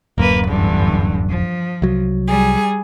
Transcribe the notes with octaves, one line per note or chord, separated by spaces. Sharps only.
D1 F#2 A#3 B4
E2 G2 D3
F3
C2 F#3
G3 G#4